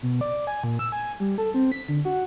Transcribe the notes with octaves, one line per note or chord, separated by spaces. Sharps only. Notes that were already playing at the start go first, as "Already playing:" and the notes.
B2
D5
G#5
A#2
E6
G#5
G3
A4
C4
B6
D3
F#4